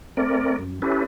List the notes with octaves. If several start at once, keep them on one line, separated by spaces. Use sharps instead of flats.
A3 C4 A#4 D5
F#2
C#4 E4 G4 A4 B4